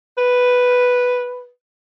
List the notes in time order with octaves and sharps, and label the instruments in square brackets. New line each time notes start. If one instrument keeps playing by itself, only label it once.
[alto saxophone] B4